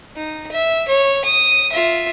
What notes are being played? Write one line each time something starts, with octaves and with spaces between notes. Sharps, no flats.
D#4
E5
C#5
D#6
F4 E5